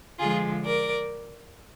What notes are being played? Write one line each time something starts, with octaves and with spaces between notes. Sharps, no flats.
D3 F3 G#3 F4 G#4
A#4 D5